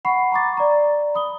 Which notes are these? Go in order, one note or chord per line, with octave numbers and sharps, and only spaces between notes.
F#5 B5 C#6 C7
A#5 B5 C#6 D6 A6
D5 A#5
B5 D#6 G7